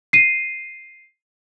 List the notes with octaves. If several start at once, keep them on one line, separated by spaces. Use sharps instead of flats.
C7 D#7